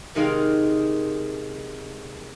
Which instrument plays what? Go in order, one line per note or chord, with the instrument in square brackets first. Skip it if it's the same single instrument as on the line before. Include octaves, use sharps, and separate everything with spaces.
[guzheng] C3 D#3 G#3 D#4 A#4 F5